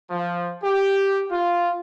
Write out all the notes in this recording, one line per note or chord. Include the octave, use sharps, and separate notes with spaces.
F3
G4
F4